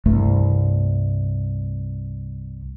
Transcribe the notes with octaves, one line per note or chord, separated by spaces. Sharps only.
C2 G2 A3